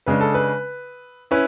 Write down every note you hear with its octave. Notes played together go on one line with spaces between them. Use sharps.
C#3 G#3 D4 B4
A4
B4
C#4 E4 B4